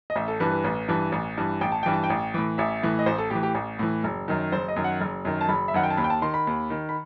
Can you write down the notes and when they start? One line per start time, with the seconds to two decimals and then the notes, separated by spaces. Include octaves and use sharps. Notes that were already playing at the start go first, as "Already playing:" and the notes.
0.10 D#5
0.16 A1 E5
0.28 A4
0.40 G2 E3 B4
0.52 B4
0.64 A1
0.88 G2 E3
1.12 A1
1.38 G2 E3
1.61 A1 G5
1.72 A5
1.83 G2 E3 G5
1.93 A5
2.04 G5
2.10 A1
2.34 A2 E3
2.58 A1 E5
2.83 A2 E3
2.99 D#5
3.06 A1 C5
3.18 A4
3.30 A2 E3 G4
3.43 G4
3.55 A1
3.79 A2 E3
4.04 F#1
4.28 F#2 D#3
4.52 F#1 C5
4.68 D#5
4.76 F#2 D#3
4.84 F#5
5.01 F#1
5.25 F#2 D#3
5.41 A5
5.49 F#1 B5
5.68 E5
5.74 F#2 D#3 F#5
5.83 G5
5.90 A5
5.97 D#2 B5
6.04 G5
6.10 A5
6.22 D#3 C6
6.34 B5
6.47 D#2
6.70 D#3
6.89 B5